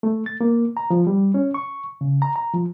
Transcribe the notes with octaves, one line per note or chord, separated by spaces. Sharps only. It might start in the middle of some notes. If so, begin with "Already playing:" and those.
A3
A6
A#3
A#5
F3
G3
C#4
C#6
C#3
A#5
A#5
F3